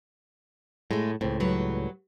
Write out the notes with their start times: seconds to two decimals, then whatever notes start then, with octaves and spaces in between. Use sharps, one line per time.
0.91 A2 G#3 A3
1.21 C#2 A2 C4
1.40 F#3 G3 B4